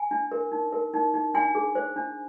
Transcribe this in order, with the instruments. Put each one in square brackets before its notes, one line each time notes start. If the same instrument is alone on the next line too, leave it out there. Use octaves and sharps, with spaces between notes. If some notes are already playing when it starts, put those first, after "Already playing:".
Already playing: [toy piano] G#5
D4
A#4
D#4
A#4
D#4
D#4
D4 G#5
G#4
C5
D4